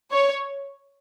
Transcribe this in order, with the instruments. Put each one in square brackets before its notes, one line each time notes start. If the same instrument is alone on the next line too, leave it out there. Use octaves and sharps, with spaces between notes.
[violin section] C#5